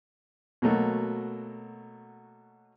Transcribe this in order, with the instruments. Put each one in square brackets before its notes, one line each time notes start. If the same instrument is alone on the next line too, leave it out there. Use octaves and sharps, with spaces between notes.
[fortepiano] B2 F#3 A3 A#3